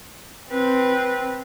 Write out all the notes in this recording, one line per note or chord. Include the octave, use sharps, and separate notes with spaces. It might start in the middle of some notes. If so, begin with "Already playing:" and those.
C4 B4